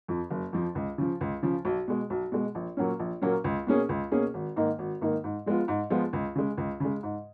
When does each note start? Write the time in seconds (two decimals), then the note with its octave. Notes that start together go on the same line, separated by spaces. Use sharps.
0.08 F2 F3
0.30 F#1
0.53 F2 F3
0.75 C#2
0.98 C#3 F3
1.21 C#2
1.43 C#3 F3
1.65 B1
1.88 B2 G#3
2.10 B1
2.32 B2 G#3
2.55 A#1
2.77 A#2 F#3 A#3 C#4
2.99 A#1
3.22 A#2 F#3 A#3 C#4
3.44 C#2
3.67 B2 A#3 C#4 G#4
3.89 C#2
4.12 B2 A#3 C#4 G#4
4.34 G#1
4.56 G#2 D#3 A#3 D#4
4.79 G#1
5.01 G#2 D#3 A#3 D#4
5.24 G#2
5.46 F3 G#3 B3 F4
5.68 G#2
5.90 F3 G#3 B3 F4
6.13 C#2
6.36 C#3 G#3
6.58 C#2
6.80 C#3 G#3
7.03 G#2